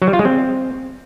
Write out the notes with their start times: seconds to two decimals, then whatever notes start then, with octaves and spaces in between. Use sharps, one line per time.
0.02 F#3
0.07 G3
0.13 F4
0.19 G#3
0.25 C4